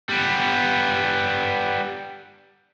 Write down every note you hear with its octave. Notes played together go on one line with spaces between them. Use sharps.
G3 B3